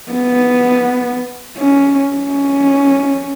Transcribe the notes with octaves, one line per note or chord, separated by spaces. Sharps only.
B3
C#4
C#4